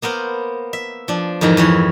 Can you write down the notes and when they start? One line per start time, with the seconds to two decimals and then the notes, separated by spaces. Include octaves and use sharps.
0.02 A#3 B3 A#4 C5
0.73 E5
1.08 F3 D4
1.41 F2 G#2 D#3 E3 A#4
1.57 F2 E3 C#5